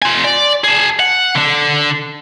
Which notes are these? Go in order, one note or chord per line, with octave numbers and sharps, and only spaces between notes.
F4 G#5
D5
G#4 A5
F#5
D3 D4